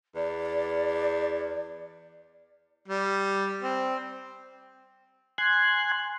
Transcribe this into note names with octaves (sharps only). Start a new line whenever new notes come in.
E2 D5
G3
C4
G#5 C6 F#6 G#6